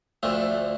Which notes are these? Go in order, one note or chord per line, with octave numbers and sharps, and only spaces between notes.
D2 D3 F3 A3